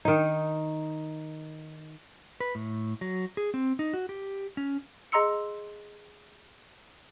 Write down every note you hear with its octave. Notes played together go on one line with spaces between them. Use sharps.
D#3 D#4
B4
A2
F#3
G#4
C4
D#4
F#4
G4
C#4
G#4 D#5 A#5 C6 E6 C#7